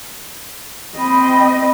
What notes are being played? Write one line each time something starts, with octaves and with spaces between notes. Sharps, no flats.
C4 D#5 B5